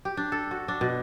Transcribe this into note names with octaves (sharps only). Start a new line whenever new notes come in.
G4
D4
A4
F#4
D4
B2